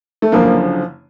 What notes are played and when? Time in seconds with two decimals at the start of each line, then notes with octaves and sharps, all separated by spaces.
0.22 A3
0.32 F#1 F#2 D3 F3 A#3